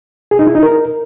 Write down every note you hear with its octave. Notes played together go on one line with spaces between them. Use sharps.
G#4
D#4
E4
D#4
A#4